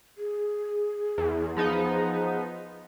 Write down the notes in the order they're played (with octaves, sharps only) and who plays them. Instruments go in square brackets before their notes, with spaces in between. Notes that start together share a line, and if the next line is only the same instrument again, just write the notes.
[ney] G#4
[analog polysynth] E2
F3 B3 D#4